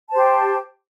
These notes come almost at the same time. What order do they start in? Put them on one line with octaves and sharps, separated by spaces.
A5 C5 G4